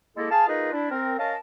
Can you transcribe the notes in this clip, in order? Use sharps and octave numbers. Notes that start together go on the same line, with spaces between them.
G#3 A#3 E4 A4
G#4 F5 G#5 A5
A#3 D#4 F4 G#4 B4 D#5
D4 E4
C4 A#4
C#4 A#4 D#5 F5 A5